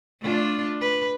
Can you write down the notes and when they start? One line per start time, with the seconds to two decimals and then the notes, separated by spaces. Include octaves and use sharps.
0.21 A3 D4 F4
0.81 B4